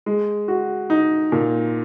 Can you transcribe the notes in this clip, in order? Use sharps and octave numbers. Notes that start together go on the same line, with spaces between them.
G#3
F#4
D#4
A#2